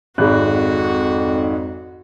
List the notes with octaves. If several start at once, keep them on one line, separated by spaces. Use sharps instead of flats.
G#1 F2 G#2 F#4 G#4 B5 F#6